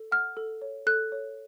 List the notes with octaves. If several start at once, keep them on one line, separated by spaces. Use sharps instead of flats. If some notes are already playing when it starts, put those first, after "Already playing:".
Already playing: A4
F#5 F6
A4
C#5
A4 F#6
C#5